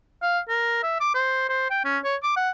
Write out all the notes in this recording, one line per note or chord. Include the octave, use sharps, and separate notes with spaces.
F5
A#4
E5
D6
C5
C5
G5
C#4
C#5
D6
F#5